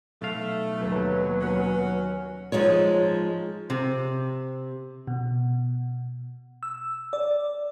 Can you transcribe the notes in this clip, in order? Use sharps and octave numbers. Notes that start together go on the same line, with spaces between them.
B1 A3 F5
D#2 F#3 B4
C#4 F#4
F3 G#3 D#4 C#5
C3
B2
E6
D5